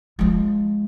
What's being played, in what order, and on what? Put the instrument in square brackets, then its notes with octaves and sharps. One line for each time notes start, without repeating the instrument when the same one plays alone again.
[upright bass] F3 G#3